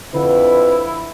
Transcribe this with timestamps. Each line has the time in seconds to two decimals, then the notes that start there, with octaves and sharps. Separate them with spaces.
0.14 F2 D3 E4 B4 F#5